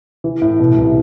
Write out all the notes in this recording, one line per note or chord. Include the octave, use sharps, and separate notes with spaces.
E3
A2
B2
C2